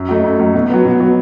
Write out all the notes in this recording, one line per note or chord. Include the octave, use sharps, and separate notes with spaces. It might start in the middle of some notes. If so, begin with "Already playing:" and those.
Already playing: F#2
F#3 A3 D#4
F#2
F#3 A3 D#4
B2
F#3 B3
B2
F#3 B3